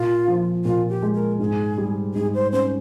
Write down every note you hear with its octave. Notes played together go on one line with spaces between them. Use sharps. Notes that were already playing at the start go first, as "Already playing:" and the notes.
Already playing: A#2 F4
F3
A#2 F4
G4
G#3
A#4
G#2 G#4
G3
G#2 G#4
C5
C#4 C5